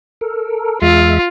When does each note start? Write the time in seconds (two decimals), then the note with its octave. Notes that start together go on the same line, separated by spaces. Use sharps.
0.21 A4 A#4
0.82 E2 G#3 F4 E5